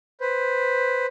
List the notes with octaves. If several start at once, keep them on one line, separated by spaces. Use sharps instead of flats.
B4 C5